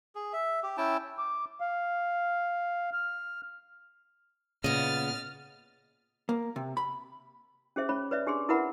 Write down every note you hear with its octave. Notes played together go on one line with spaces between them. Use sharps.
G#4
E5
G4
C#4 E4 G5 A5
D6
F5
F6
A#2 C#3 B3 D#5 F6 A6
A#3
C3
B5
C#4 G4 G#4 C5 E5
C#4 C#5 B5
B4 C#5 D5 E5
D4 G4 G#4 C6
E4 A#4 B4 E5 F#5 B5